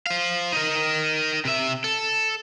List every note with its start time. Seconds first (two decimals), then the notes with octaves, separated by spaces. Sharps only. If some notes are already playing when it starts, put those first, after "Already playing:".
0.06 C5 F5
0.53 D#4 A#4
1.45 C3 E5
1.84 A4